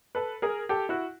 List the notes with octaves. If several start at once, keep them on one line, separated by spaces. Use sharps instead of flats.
A4 B4
G#4 A#4
G4 A4
E4 F#4